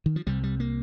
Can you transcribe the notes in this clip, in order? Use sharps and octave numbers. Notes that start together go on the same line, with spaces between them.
D#3
F3
C2 C3 G3
G3
A#3